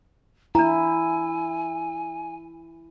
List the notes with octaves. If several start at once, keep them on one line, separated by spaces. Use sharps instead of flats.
D4 E4 G#5 A#5